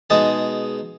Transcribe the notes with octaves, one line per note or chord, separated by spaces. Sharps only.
B2 G#3 D#4 G#4 A5